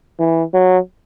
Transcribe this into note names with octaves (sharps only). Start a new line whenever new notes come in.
E3
F#3